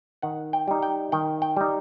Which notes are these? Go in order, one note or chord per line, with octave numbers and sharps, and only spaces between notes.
D#3 F#5
G5
G3 D#4
G5
D#3 G5
G5
G3 D#4